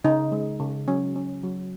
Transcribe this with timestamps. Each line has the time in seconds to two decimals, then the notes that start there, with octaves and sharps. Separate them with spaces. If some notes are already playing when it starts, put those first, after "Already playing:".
0.04 C#3 D#4
0.32 G#3
0.60 C#3
0.88 F#3 C#4
1.16 C#4
1.44 F#3